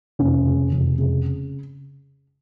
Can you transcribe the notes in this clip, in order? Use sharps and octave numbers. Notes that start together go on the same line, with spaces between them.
F1 C#4
C#3
F1
C#3